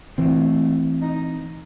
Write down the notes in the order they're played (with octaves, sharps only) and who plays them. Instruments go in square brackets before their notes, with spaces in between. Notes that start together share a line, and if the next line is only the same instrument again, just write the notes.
[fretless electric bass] E3 C4 [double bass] A3
[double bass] D#4